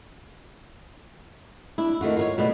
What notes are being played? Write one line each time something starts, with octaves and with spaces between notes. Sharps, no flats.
D4 E4
D#3 A3 F4 F#4
F4 A#4 C#5
B2 D3 A3 B3